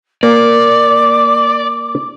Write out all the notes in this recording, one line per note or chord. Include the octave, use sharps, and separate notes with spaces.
A#3 D5 D6